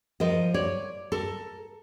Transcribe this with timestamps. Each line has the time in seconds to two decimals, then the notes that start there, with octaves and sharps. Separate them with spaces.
0.20 F3 A#4 D#5
0.54 C#5 D5
1.12 A4 A#4